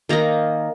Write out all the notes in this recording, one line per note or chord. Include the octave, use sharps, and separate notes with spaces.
D#3 A#3 D#4 A#5